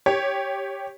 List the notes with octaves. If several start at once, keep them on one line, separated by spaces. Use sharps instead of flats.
G4 C#5